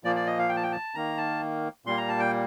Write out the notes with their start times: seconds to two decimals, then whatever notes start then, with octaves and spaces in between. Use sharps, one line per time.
0.04 A#2 F3 A#3 D5
0.16 D5
0.26 D#5
0.38 F5
0.49 G5
0.56 A5
0.63 G5
0.72 A5
0.95 D#3 A#3 A#5
1.17 A5
1.85 A#2 G3 A#3 C6
1.97 A#5
2.09 A5
2.20 G5